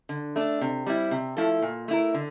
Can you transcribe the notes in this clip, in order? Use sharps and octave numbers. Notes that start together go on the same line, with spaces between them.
D3
A3 D4
C3
G3 C4 E4
C3
F3 A3 E4 A4
A#2
A3 E4 A#4
D3